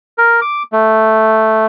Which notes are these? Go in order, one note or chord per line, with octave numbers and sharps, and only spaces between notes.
A#4
D6
A3